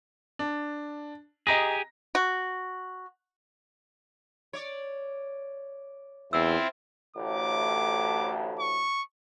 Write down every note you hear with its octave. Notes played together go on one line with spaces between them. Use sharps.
D4
G4 G#4 D#5 A#5 A#6
F#4
C#5 D5
E2 C4 E4 F4 E6
A1 D2 A2 D6
C#6